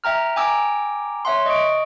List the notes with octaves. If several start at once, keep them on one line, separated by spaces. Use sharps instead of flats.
E5 G5 A#5 F6
G5 G#5 A#5 D6 E6
C#5 E5 F#5 C6
D#5 C#6 D7